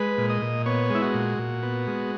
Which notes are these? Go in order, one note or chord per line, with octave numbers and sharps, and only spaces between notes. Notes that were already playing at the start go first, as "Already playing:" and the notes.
Already playing: G#3 B4
A#2
D#5
A#2
B3 C#5
G#3 E4
F#4
A#2
A#2
B3
G#3